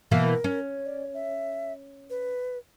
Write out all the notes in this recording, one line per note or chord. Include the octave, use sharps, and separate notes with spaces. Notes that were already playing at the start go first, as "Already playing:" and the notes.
B2 E3 A#3 A#4
C#4
D5
E5
B4